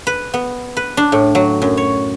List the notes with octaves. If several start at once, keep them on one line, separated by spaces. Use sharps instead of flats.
B4
B3
B4
D4
A2
F#3
F#2
C#5